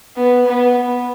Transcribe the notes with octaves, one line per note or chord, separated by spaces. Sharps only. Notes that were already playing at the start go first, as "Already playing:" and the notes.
B3
B3